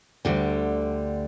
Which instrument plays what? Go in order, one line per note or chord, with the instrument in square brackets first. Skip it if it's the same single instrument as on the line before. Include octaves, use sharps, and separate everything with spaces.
[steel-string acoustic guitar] D2 D3 G3